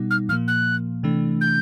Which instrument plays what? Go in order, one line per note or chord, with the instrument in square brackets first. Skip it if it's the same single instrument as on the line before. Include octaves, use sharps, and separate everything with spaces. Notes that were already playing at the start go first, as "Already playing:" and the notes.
Already playing: [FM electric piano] B2 G3 B3 D#4
[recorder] F6
[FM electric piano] A#2 F3 A#3 [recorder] F6
[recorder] F#6
[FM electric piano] C3 E3 A3 D4
[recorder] G6